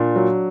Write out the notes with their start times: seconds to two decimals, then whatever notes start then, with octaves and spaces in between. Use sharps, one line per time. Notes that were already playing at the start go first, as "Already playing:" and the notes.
Already playing: A#2 D4
0.16 F#3